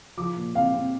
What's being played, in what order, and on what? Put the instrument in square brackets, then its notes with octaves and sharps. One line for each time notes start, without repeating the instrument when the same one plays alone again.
[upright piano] F3 D6
A#2
C4 F5
C4